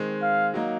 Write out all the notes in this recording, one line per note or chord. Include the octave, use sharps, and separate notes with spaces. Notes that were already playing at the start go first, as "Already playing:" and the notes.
Already playing: D#3 G#3 C4
F5
F#3 A#3 D#4